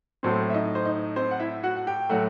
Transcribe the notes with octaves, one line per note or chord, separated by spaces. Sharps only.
A2 F#3 A3 C4 C5
E5
D#4 D#5
C5
D#4 D#5
C4 C5
F#5
E4 E5
F#4 F#5
F#5
G4 G5
A2 F#3 A3 F#4 F#5